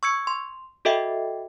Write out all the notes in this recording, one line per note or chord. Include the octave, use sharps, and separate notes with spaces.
C#6 E6 G#6 C#7
C6
F#4 A4 D#5 E5 G5